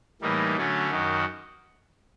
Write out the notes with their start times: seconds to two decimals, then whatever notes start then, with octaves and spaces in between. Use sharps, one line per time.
0.22 A2 E3 G3 A#3 D#4
0.57 D3 F#3 A3 C#4
0.90 F#2 D#3 F#3